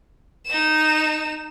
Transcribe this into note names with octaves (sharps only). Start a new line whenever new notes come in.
D#4 E7